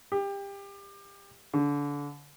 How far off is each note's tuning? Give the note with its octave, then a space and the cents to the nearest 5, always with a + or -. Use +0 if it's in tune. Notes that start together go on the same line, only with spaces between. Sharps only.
G4 +25
D3 -30